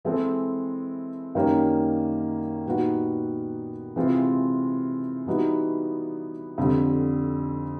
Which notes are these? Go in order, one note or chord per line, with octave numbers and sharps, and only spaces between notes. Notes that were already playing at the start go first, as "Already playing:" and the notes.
E3 G#3 C4 E4 A4
F#2 D#3 G3 A#3 C#4
A#2 G3 B3 D#4 F#4
C3 E3 G#3 C4 F4
E3 G3 B3 D#4 F#4
F2 D3 G3